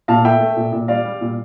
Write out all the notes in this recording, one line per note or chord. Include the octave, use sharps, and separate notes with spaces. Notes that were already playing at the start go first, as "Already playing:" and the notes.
A#2 F5 A5
A3 E5 G5
A3
A#2
A#2
G3 D5 F5
G3
A#2